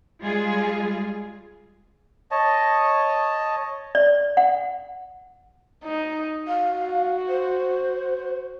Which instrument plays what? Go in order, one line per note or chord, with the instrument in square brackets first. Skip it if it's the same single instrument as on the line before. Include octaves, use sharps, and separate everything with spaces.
[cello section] G3 G#3 F4 G#4
[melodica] C#5 D#5 A5
[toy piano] D5
F#5
[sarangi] D#4
[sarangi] F#4 [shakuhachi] F5
[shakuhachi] C5